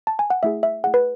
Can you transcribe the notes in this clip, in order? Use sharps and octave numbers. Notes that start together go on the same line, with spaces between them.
A5
G#5
F#5
A3 E4 G#4 E5
E5
A3 E4 G#4 F#5
B4